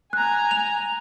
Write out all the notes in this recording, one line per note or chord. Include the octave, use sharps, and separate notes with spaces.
G#5 A#5 F#6
F7